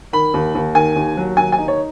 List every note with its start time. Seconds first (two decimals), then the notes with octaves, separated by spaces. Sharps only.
0.13 D#3 B5
0.34 D#2
0.55 D#2
0.75 D#3 G#5
0.96 D#2
1.17 F#3
1.37 D#2 G#5
1.52 G#5
1.58 D#4
1.68 C#5